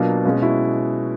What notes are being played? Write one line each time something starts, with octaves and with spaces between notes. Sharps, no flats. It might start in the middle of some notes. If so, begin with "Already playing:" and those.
Already playing: B2 F#3 A#3 D4 F4
B2 G#3 C#4 F4
E4 F#4